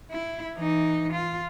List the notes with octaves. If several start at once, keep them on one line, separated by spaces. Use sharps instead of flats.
E4
E3 D#4
F4